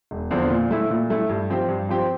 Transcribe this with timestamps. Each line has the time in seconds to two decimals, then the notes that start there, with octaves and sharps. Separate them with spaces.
0.11 E1
0.31 E2 D3 F3 C4
0.50 A#2
0.71 A3 E4
0.90 A#2
1.10 A3 E4
1.29 G2
1.50 F3 C4 G4
1.68 G2
1.89 F3 C4 G4